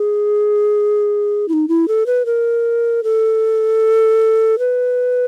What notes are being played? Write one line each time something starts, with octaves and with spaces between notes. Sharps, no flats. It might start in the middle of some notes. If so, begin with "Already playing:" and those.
Already playing: G#4
E4
D#4
E4
A4
B4
A#4
A4
B4